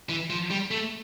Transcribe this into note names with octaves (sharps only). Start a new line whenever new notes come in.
E3
F3
G3
A3